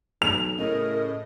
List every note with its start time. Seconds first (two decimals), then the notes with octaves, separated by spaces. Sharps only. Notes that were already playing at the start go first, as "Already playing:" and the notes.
0.22 B1 F7
0.58 A2 C#3 A#4 D#5